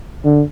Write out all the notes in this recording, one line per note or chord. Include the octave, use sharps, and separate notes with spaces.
D3